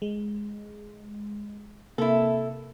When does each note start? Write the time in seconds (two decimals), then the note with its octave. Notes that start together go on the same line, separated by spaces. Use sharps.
0.02 G#3
1.98 C3 A#3 E4 A4